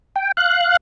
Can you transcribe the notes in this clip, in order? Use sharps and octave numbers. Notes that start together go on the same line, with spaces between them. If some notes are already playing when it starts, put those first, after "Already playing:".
G5
F5 F#6